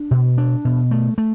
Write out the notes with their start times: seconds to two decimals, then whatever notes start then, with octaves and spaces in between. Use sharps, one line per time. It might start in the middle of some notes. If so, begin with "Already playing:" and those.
Already playing: D4
0.11 B2
0.38 D4
0.65 B2
0.91 A3
1.18 A3